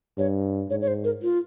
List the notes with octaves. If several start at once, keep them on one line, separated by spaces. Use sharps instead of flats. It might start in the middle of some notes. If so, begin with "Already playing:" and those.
G2 C#5
G#2 C#5
C#5
C5
A#4
F4